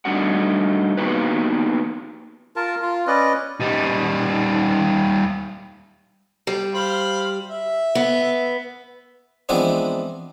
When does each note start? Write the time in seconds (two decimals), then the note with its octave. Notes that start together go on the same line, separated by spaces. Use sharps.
0.05 G3 A3 D4 D#4 F#4 F#5
0.97 A#3 B3 D#4 F#4 G4 B4
2.56 F4 A#4 A5
2.82 F4
3.07 C#4 B4 D5 D#5
3.60 G3 D#4
6.47 G3
6.74 C5 F5 B5
7.50 E5
7.95 B3
9.49 E3 F3 G#3 B3 C4 D4